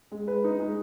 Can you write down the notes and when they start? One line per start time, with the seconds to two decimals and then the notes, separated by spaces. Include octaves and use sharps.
0.12 G#3
0.28 B4
0.44 D#4
0.60 G#3